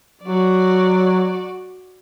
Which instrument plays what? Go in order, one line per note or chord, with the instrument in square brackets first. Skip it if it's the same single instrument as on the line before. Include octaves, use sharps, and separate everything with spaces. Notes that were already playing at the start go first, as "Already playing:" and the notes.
[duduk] F#3 [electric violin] F#4 D5